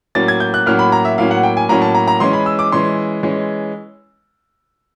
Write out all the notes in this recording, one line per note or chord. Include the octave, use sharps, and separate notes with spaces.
A2 F#3 A#3 C#4 A6
G#6
G6
F#6
A2 F#3 A#3 C#4 F6
B5
A#5
E5
A2 F#3 A#3 C#4 F5
F#5
G5
G#5
A2 F#3 A#3 C#4 A#5
A5
A#5
A#5
E3 G#3 C#4 C6
B5
E6
D6
E3 G#3 C#4 C6
E3 G#3 C#4